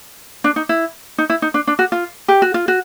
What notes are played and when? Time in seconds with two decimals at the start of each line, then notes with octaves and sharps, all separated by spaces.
0.44 D4
0.56 D#4
0.69 E4
1.18 D#4
1.30 E4
1.42 D#4
1.54 D4
1.67 D4
1.79 F#4
1.92 F4
2.28 G4
2.42 F#4
2.54 F4
2.68 F#4